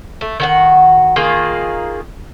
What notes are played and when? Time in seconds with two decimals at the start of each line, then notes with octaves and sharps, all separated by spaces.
0.21 A3
0.40 D#3 F#4 F#5
1.16 D#3 A#3 F4 G#4